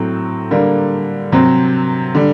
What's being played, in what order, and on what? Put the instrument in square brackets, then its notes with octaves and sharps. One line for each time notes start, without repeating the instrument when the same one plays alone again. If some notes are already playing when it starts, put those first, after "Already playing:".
Already playing: [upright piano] A2 F#3 C4
D3 G3 A#3
C3 F#3 C4
D3 G3